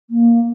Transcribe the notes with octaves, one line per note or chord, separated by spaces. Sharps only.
A#3